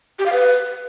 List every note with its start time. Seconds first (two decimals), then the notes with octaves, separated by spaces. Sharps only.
0.19 G4
0.26 F5
0.33 B4